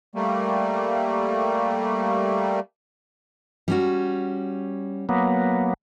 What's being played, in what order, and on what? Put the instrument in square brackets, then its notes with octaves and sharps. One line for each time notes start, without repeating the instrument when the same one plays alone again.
[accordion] G3 A3 A#3
[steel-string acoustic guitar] G3 C#4 F#4
[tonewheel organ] F#3 A#3 B3